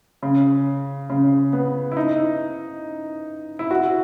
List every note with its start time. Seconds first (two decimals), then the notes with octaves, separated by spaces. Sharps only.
0.23 C#3
1.10 C#3
1.53 B3
1.92 E4
1.97 D#4
3.59 E4
3.71 F#4